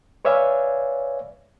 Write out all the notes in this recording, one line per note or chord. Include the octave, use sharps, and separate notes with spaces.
B4 C#5 D5 E5 F5 G#5